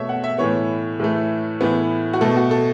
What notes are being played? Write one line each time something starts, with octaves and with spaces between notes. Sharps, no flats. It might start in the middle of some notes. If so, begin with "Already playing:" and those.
Already playing: B2 A3 C#5 E5
F#5
E5
A2 E3 B3 C#5
A2 E3 A3
A2 E3 B3
F#4
B2 A3 A4
F#4
A4